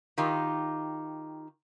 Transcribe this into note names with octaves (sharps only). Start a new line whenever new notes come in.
D#3 D#4 F4 G4